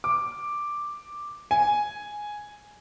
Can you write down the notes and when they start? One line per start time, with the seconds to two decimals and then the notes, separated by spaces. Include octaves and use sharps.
0.04 D6
1.51 G#5